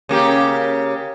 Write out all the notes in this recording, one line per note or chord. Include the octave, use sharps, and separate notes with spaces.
C#3 A#3 G4